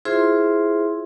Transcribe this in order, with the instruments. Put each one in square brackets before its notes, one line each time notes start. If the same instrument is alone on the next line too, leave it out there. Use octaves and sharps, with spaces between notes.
[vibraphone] E4 F4 G#4 C5 E5 C6